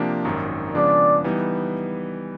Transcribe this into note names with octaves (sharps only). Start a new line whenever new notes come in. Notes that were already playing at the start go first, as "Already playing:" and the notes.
Already playing: C3 F3 A#3 D4 G4
G#1 F#2 D#3
C#3 F3 G#3 B3 D4 D5
E3 G3 B3 D#4